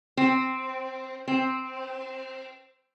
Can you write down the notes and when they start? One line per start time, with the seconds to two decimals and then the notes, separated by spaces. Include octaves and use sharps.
0.17 C4
1.28 C4